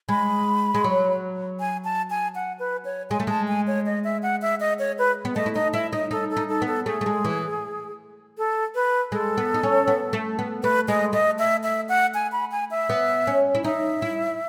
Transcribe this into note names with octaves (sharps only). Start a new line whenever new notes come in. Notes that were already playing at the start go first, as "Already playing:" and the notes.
G#3 B5
G#3
F#3
G#5
A5
G#5
F#5
B4
C#5
G#3 G#5
A3
G#3 A5
G#5
C#5
D#5
E5
F#5
E5
D#5
C#5
B4
B3
A3 D#5
E4
D#4 D#5
E4 E5
D#4 D#5
D#4 A4
A4
D#4
A4
B3
A4
A3 G#4
A3
G#3
E3
A4
B4
G#3 A4
B3
D#4
C#4
B3
A3
B3
A3 B4
G#3 D#5
A3 D#5
E5
E5
F#5
G#5
B5
G#5
E5
B3
C#4
E4
D#4 E5
E4